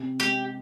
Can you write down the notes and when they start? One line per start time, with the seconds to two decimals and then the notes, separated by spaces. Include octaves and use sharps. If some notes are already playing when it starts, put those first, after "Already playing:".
Already playing: C3
0.20 G#3 G4